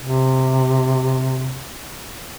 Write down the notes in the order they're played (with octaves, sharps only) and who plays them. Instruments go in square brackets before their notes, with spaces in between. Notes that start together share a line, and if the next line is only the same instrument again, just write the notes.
[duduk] C3